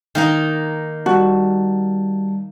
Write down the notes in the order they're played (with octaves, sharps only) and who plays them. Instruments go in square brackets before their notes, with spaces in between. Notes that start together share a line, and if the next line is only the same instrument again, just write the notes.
[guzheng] D#3 A#3 D#4
[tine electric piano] G3 A5 [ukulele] F#4